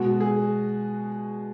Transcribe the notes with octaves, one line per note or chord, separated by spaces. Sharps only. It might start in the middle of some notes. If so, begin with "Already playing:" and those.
Already playing: B2 G#3 F#4
G#4